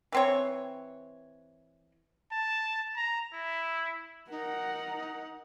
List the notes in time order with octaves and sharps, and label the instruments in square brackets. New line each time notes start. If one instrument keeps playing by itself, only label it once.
[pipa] E3 C4 C#5
[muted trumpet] A5
A#5
E4
[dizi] D#4 [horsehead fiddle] A#4 F#5